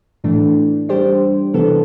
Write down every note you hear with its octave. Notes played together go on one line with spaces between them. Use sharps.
A2 E3 A3 D4
G3 D4 G4 C5
C3 E3 B3 D4 A4